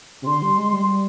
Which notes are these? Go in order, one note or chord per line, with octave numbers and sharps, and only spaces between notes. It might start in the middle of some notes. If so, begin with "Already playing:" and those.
C3
D3 C6
G3
G#3
G3